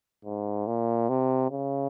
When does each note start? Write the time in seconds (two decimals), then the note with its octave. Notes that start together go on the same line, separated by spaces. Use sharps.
0.25 G#2
0.67 A#2
1.09 C3
1.51 C#3